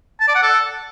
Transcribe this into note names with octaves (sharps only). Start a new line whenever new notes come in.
A5
D5
F#5
A4